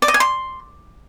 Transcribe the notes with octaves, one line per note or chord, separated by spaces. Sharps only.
D5
D#5
G#5
C6